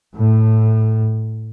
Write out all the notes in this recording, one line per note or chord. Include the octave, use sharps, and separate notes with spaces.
A2